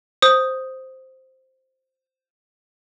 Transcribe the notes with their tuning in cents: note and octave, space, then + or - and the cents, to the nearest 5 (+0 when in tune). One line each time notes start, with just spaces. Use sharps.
C5 +0 D#6 +0